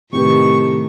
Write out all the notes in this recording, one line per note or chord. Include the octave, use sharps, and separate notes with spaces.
A2 C3 D#3 G4 B4 C#6